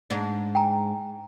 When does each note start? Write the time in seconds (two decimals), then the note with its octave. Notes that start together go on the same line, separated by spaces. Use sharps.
0.10 G#2 D4
0.55 G5 G#5 A#5